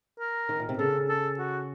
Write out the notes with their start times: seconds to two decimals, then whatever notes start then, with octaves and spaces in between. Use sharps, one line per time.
0.19 A#4
0.49 D#3
0.60 A#2
0.69 C3
0.78 C#3 A4
1.09 A4
1.38 F#4